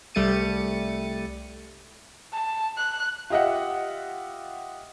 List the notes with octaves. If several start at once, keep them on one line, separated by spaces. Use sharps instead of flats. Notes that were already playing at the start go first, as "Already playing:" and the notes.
C2 G3 A3 A6 C#7 D#7
A5
F#6
F4 G4 D#5 E5 F#5